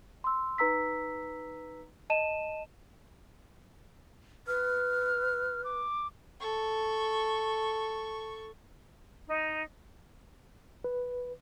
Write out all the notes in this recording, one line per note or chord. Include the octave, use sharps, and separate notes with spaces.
C6 E6
D#4 B4 A#5 E6 B6
D#5 A5 D#7 E7
B4 F6
D6
A4 C#6
D#4
B4